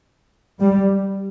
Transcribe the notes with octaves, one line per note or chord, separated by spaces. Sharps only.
G3